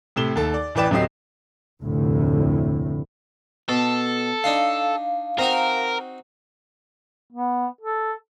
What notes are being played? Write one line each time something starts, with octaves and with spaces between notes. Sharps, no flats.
A2 C3 E7 G7
D#2 A4
D5
A1 E3 B4 D5 G5 E7
D1 F#3 C4 G4 D#5 C7
F1 D2 A2
B2 A4
D4 D#4 F5 C6
C4 D#4 F#4 A#4
B3
A4